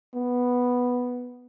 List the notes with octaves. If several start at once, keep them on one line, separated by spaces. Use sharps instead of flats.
B3